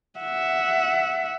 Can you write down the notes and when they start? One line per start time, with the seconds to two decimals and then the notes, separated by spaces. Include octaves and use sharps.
0.20 E5 F#5